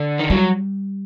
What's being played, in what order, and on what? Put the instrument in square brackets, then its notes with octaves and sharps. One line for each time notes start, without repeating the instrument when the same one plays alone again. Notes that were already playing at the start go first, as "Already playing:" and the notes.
Already playing: [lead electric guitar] D3
D#3
[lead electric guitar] F#3 [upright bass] G3